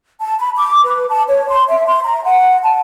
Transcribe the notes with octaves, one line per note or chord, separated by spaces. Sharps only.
A5
B5
D6
B4
A5
C#5
C6
E5
C6
A#5
F#5
A5